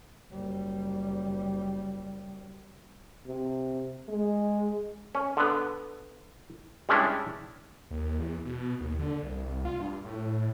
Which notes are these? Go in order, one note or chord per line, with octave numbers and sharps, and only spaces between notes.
F#1 G3
C3
G#3
C#4
D3 B3
G3 G#3 C#4 D4 E4
D#2
E2
B2
D#2
D3
C2
F4
G2
A2